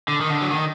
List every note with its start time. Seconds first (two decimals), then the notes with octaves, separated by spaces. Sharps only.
0.08 D3
0.21 D#3
0.30 D3
0.42 F#3
0.51 D#3